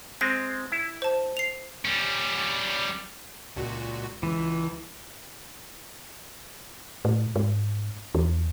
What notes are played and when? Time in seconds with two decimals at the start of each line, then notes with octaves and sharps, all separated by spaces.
0.21 G#3 C4 A#6
0.72 E4
1.02 C5 A5
1.37 C7 F7
1.85 G3 C#4
3.56 C#2 A#2 F#4
4.23 C#2 E3
7.05 A2
7.36 G#2
8.15 E2